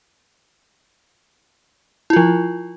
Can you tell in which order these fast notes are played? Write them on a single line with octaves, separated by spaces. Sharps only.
E4 F4 F3